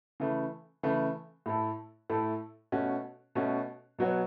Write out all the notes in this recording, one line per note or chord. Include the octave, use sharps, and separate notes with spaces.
C#3 E3 A3
C#3 E3 A3
A2 A3 E4 A4
A2 A3 E4 A4
B2 A3 C#4 F#4
B2 A3 C#4 F#4
B2 F#3 B3 F#4 C#5